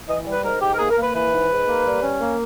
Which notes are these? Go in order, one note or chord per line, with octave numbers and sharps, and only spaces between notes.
E3 D#5
G3
B4
G#2 A#4
G#2 G4
A#4
A#3 G#4
A#4
A#3
B4
E3 B4
G#2
G#2
A#3
G3
C#4
A#3